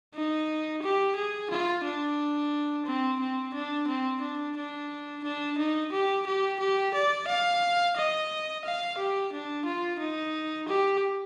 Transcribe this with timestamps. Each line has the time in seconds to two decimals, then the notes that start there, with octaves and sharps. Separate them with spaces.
0.15 D#4
0.83 G4
1.16 G#4
1.51 F4
1.84 D4
2.86 C4
3.20 C4
3.54 D4
3.87 C4
4.22 D4
4.56 D4
5.24 D4
5.58 D#4
5.92 G4
6.27 G4
6.60 G4
6.94 D5
7.28 F5
7.97 D#5
8.65 F5
8.98 G4
9.33 D4
9.65 F4
10.00 D#4
10.68 G4